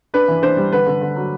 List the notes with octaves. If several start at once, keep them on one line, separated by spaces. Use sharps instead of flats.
D4 B4
E3
D4 C5
G3
D3 B4
D3
D3
F#3